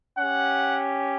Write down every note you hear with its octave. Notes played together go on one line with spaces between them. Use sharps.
C#4 G4 F#5